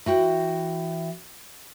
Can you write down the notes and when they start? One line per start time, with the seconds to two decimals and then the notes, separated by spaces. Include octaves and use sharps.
0.06 E3 F#4 G5